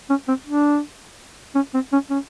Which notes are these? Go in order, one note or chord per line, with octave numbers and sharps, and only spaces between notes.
C#4
C4
D4
C#4
C4
C#4
C#4